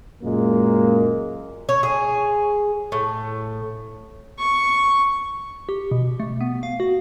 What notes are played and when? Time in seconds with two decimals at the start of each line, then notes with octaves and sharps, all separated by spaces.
0.22 F#2 A#2 G#3 A#3
1.69 C#5
1.83 G#4
2.92 A2
4.39 C#6
5.69 G4
5.91 B2
6.20 A3
6.41 B3
6.63 F5
6.80 F#4